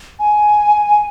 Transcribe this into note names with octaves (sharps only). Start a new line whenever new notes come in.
G#5